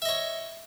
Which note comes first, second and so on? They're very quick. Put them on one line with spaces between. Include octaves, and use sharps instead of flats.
E5 D#5 C#5